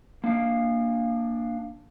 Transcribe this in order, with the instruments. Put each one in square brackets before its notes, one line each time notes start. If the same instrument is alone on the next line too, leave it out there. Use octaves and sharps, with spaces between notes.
[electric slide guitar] A#3 D4 F5